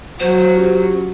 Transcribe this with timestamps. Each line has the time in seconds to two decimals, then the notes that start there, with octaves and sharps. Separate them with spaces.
0.20 F#3 C5
0.54 C#4 F4 G4